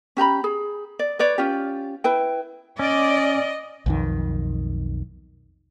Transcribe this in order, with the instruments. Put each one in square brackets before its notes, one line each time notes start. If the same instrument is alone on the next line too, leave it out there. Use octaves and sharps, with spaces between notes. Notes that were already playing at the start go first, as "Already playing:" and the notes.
[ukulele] C#4 G4 A#5 B5
G#4
D5
B4 C#5 D5
C#4 F4 G4
E4 B4 G5
[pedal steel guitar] C#4 [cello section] D5 [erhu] D#5
[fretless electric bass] B1 F2 D#3